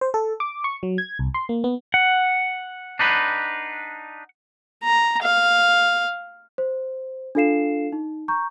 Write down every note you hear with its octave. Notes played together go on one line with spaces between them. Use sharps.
C5
A4
D6
C#6
F#3
G#6
C2
C6
A#3
B3
F#5
D4 D#4 B4
A#5
F5
C5
D4 F4 A4 F5 C7 E7
D#4
A#5 C#6 G6